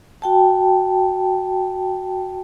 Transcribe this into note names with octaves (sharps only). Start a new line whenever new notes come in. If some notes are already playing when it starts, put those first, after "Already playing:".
F#4 G5 A5